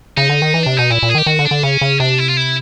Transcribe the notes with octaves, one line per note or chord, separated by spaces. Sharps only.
C#3 D#4
D3
D#3
E3
C3 D4
B2 D#4
A#2 E4
A#2
G#4
D#3
G4
D#3 F#4
D3
D4
D3
C#3 C#4
C#3
C3 D4
E4
F4
E4